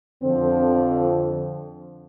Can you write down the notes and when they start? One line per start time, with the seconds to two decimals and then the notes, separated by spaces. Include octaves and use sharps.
0.22 F2 D3 F3 C4